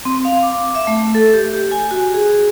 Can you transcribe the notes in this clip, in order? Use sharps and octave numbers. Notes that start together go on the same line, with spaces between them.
C4
F5
D6
E5
A3
A4
G4
G4
G#5
F#4
G#4